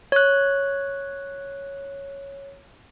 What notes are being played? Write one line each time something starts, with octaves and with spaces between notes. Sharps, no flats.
C#5 F#6